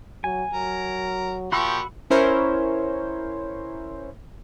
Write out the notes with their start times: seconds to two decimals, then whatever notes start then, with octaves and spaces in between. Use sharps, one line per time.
0.24 F#3 G#5
0.53 F#3 A#4
1.52 A#2 F3 F#4 G4 B5 C#6 E6
2.10 C#4 E4 A#4 C5 C#5